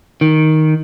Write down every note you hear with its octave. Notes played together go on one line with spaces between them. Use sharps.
D#3